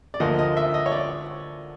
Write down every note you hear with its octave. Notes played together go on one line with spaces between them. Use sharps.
D5
D2 D3 F3 A#3 D#5
D#5
E5
D#5
C#5
D5